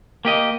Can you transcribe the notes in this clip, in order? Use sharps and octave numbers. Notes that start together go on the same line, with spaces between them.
A#3 G4 D#5